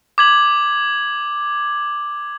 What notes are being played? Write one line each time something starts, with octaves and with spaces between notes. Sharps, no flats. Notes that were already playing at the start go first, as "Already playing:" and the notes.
D6 G#6 F#7